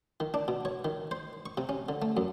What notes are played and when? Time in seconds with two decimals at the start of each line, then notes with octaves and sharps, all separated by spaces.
0.20 D#3
0.34 D4
0.48 B2
0.65 C#5
0.85 D#3
1.11 C5
1.46 C#6
1.57 C3
1.69 C#4
1.89 D3
2.02 A3
2.17 F#2